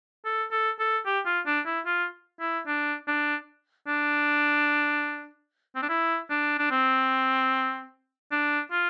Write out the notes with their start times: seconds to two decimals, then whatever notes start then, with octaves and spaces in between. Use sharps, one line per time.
0.25 A4
0.51 A4
0.79 A4
1.05 G4
1.26 F4
1.46 D4
1.66 E4
1.86 F4
2.40 E4
2.67 D4
3.07 D4
3.88 D4
5.75 C4
5.82 D4
5.89 E4
6.30 D4
6.58 D4
6.71 C4
8.32 D4
8.71 F4